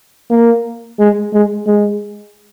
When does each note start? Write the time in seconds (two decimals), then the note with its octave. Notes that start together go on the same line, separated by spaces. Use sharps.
0.30 A#3
0.99 G#3
1.33 G#3
1.66 G#3